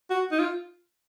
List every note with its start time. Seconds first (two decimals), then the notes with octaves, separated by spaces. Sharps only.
0.10 F#4
0.32 D#4
0.39 F4